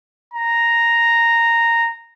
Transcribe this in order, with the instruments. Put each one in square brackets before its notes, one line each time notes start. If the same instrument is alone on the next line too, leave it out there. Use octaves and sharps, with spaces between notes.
[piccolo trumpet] A#5